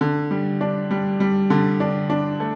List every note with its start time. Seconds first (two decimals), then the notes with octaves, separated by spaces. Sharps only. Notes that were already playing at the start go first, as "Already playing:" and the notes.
0.01 D3
0.31 G3
0.61 D4
0.91 G3
1.20 G3
1.50 D3
1.80 D4
2.10 D4
2.40 A3